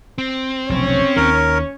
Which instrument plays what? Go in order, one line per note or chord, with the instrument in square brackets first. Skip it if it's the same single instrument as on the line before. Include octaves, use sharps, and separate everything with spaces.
[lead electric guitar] C4
[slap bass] F1 B1 [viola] C#4 C#5
[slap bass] D#2 D#3 [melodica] A#4